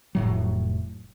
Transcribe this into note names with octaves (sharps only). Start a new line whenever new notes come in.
F1 A2 F#3